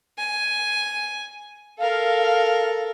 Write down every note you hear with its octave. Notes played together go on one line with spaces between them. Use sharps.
G#5
A4 A#4 F5